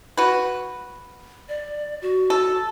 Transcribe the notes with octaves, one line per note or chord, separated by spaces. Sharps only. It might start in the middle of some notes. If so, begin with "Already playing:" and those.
F#4 B4
D5
F#4
A4